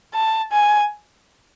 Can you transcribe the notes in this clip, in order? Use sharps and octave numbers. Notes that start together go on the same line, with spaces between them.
A5
G#5